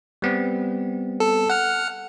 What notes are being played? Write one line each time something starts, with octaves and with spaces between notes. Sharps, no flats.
G3 B3 C4
A4
F#5 F6